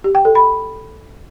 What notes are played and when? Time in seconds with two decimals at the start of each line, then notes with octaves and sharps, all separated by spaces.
0.04 G4
0.15 G5
0.25 A4
0.35 B5